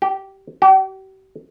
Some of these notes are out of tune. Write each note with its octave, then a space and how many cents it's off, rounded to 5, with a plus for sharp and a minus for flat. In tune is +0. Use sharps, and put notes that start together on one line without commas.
G4 -15
G4 -40